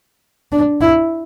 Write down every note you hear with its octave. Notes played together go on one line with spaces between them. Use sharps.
D4
E4